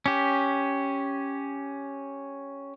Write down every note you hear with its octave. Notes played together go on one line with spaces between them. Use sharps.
C#4 G4